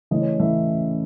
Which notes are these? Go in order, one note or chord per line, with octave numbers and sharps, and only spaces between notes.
C#3 E3 A3 C#4 D#5
C#5
C#3 E3 A3 C#4 E5